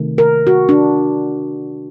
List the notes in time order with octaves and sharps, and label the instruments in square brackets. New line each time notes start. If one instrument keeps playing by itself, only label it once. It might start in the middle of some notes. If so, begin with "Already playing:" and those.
Already playing: [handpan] C3 D#3 A3
A#4
F#4
D4